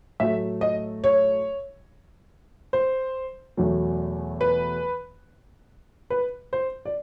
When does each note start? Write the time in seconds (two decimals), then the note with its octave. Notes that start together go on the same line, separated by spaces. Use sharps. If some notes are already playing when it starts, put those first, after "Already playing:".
0.20 A2 F#3 A3 E5
0.61 D#5
1.04 C#5
2.73 C5
3.57 E2 B2 F#3 A3
4.41 B4
6.10 B4
6.53 C5
6.85 D5